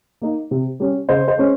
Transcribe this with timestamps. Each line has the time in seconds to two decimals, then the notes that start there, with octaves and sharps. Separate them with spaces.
0.21 A#3 D#4
0.51 C3
0.80 G3 C#4
1.09 C#3 C5 D#5
1.28 C5 D#5
1.37 G#3 C#4